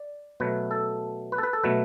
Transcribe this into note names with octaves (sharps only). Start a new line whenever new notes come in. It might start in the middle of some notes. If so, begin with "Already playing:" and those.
Already playing: D5
B2 F#3 A3 B4
A4
B4
A4
B4
A4
B2 F#3 A3 B4